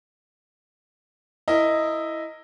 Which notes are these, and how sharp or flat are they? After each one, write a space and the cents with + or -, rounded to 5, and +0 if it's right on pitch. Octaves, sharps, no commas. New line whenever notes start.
E4 +0 A#4 -20 D#5 +0